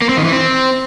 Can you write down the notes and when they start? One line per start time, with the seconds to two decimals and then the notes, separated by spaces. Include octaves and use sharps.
0.02 A#3
0.09 C4
0.17 D#3
0.25 E3
0.32 C4